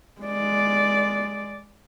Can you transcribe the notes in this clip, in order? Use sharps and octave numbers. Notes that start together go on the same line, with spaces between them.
G#3 D5